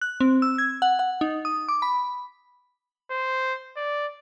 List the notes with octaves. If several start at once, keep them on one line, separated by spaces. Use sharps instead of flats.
F#6
C4
E6
G#6
F#5
F#5
D#4
D#6
D6
B5
C5
D5